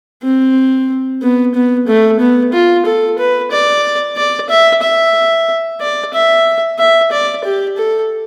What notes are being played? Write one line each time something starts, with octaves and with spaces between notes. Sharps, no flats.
C4
B3
B3
A3
B3
F4
A4
B4
D5
D5
E5
E5
D5
E5
E5
D5
G4
A4